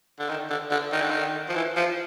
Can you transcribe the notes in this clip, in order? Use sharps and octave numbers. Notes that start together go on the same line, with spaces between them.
D3
D#3
D3
D3
D#3
D3
D#3
F3
E3
F3